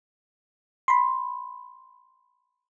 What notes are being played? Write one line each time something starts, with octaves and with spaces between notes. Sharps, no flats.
B5 C6